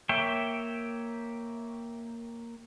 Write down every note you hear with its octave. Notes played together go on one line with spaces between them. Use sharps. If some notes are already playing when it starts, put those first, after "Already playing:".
A#3 C#5 E5 G5